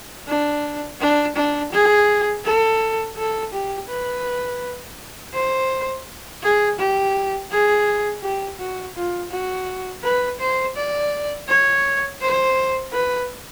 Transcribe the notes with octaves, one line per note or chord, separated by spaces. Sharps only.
D4
D4
D4
G#4
A4
A4
G4
B4
C5
G#4
G4
G#4
G4
F#4
F4
F#4
B4
C5
D5
C#5
C5
B4